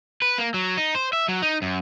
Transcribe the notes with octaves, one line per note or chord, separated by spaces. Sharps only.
B4
A#3
F#3
D#4
C5
E5
F#3
D#4
F#2